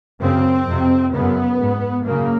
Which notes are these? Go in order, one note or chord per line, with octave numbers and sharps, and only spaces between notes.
F#2 C#3 C4
F2 C3
F#2 C#3 B3
G#2
F#2 C#3 A#3